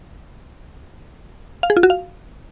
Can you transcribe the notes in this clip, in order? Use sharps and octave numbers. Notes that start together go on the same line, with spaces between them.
F5
G#4
F4
F#4
F5